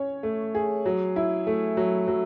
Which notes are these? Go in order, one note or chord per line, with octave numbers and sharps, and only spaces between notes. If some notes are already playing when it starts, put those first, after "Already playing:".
Already playing: C#4 C#5
A3
G#4
F#3
E4
A3
F#3
F#3